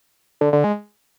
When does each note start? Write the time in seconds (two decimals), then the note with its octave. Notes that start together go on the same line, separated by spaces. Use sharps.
0.41 D3
0.53 D3
0.64 G#3